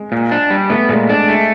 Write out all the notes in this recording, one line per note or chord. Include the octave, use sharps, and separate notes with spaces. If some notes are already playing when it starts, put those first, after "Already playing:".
Already playing: G#3
A#2
D4
G3
A3 B3
A#2 G#3
G#3 D4
G#3 A3